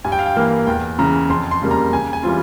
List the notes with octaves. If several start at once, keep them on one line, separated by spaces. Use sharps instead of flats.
G2 G#5
G5
F5
G5
E3 A#3
E2 G5
C#3 E3 A#5
F2 C6
C6
C#3 G3 A#3
A#5
C#3 G#5
G#5
E3 G3 C4 F4